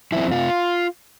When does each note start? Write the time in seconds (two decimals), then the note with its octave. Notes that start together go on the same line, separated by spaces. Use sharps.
0.12 F3 C4 E4
0.32 C3 F4